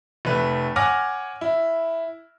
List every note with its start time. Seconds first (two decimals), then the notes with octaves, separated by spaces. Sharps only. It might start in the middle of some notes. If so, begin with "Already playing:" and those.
0.25 F1 A3 B4
0.76 C#5 F#5 G#5 D6 F6 A#6
1.41 E4